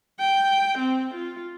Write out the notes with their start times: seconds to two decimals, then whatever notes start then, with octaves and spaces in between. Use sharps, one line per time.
0.19 G5
0.78 C4
1.15 F4